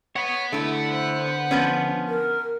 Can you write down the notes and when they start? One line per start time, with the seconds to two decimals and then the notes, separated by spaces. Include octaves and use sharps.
0.16 C#5 F#5 B5
0.52 D3 A3 E4
0.90 C5
1.51 F3 B3 C#4
2.08 A#4